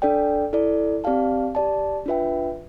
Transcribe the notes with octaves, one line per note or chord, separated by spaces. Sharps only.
D4 A4 D5 G5
E4 A4 D5
C4 G4 D5 F5 A5
G4 D5 A5
D4 F4 B4 E5 G5